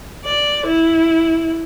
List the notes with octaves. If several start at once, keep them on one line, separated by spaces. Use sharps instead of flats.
D5
E4